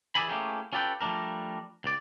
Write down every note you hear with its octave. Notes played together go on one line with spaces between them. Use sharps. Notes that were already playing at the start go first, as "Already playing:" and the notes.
E3 G#4 D5 E5 G#5 B5
A3 A#3 C#4 E4 G4 G#4
C#4 F4 G4 A4 B4 G5
F3 G3 A3 D4 A#4
C#2 D5